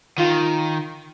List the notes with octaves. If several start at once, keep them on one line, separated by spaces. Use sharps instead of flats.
D#3 F4